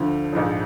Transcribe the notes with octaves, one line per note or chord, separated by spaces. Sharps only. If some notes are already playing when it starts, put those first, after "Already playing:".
Already playing: D2 D3 F3
A#1 G#2 F3